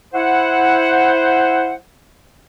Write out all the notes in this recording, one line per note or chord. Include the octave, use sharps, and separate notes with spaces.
E4 C5 F#5